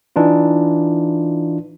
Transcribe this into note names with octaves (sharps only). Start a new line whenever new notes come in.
E3 D4 D#4 F4